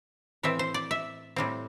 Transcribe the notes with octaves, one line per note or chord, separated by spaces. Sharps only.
A2 E3 C4 E5
C5
D5
E5
A2 G3 C4